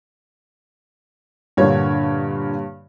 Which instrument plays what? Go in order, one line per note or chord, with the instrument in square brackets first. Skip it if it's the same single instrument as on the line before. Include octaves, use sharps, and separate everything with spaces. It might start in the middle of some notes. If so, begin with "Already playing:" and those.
[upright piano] G2 C#5 [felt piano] A#2 D3